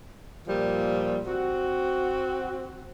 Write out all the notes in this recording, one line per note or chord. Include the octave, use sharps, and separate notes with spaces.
A#2 F3 G3
C4 F#4